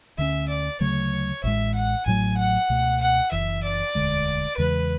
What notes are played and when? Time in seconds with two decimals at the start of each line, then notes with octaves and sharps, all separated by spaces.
0.18 D2 D3 A3 C#4 E5
0.49 D5
0.80 D2 C#3 F#3 A3 C#5
1.44 A1 A2 G#3 E5
1.75 F#5
2.06 A1 A2 F#3 A3 G#5
2.38 F#5
2.70 C#2 B2 A3
3.01 F#5
3.32 F#1 F#2 E3 E5
3.64 D5
3.95 E1 D2 D3 G#3
4.57 E2 C#3 E3 G#3 B4